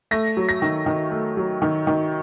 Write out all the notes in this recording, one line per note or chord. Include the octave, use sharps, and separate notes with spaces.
A3 A#6
F#3
A#6
D#3
D#3
A3
F#3
D#3
D#3